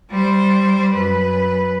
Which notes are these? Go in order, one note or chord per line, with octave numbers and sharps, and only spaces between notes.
G3 C5
F#2 B4